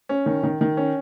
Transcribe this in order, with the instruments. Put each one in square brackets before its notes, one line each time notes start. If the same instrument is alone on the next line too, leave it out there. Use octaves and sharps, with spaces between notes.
[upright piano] C#4
D#3
D#3
D#3
C#4